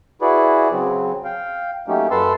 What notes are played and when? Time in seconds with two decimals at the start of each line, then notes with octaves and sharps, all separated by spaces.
0.22 E4 F#4 G#4 B4 D5
0.72 C#3 F#3 C4
1.25 F5 G5
1.88 F#3 A3 A#3 C#4 D#4 G4
2.11 F#2 A4 B4 A5 C6 E6